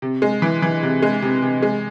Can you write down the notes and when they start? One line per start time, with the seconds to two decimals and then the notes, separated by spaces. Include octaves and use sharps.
0.02 C3
0.22 G#3
0.42 E3
0.62 E3
0.83 C3
1.02 G#3
1.22 C3
1.42 C3
1.62 G#3